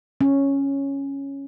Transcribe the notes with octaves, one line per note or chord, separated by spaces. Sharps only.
C#4